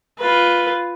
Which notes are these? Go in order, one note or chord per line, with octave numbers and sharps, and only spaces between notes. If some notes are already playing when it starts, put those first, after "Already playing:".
F4 B4